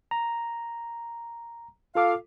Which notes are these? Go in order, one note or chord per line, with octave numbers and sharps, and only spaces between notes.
A#5
F4 A4 F5 D6